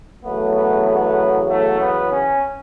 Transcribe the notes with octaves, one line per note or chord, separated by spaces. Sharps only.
E2 C#3 F#3 A3 B3
B3
B3
A3
B3
C#4